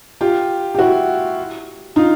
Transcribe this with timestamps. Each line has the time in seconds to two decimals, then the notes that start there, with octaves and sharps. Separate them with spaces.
0.21 F4 G4
0.75 G4
0.79 E4 F#4
1.96 D#4 F4